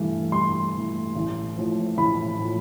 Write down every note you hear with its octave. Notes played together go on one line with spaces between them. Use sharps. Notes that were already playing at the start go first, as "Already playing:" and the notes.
Already playing: G2 E3 A3
G2 C6
E3 A3
A1
A2 F3
A1 B5
A2 F3